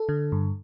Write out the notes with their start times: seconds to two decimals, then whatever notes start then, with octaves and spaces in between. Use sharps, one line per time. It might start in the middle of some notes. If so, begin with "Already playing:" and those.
Already playing: A4
0.09 D3
0.32 G2